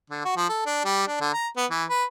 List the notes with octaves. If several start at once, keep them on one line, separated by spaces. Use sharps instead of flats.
D3
F#4
F3
A4
D4
G3
D4
D3
A#5
B3
E3
B4